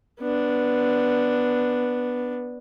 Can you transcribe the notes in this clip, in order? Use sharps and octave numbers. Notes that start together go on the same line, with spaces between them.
B3 D4